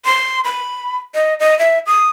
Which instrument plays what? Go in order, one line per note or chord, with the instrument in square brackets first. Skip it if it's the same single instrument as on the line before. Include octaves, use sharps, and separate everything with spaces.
[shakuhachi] C6
B5
D#5
D#5
E5
D#6